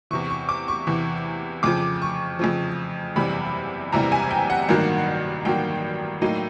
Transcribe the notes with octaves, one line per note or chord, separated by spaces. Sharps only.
E2 C3 E3 C#6
C#6
D6
C#6
E2 C3 E3
F2 C#3 F3 D6
C#6
F2 C#3 F3
F#1 E2 C3 E3 G3 B5
F#1 E2 C3 E3 G3 A#5
G#5
G5
F#5
A1 G2 D#3 F#3 A#3
A1 G2 D#3 F#3 A#3 G5
A2 F#3 A#3 D#4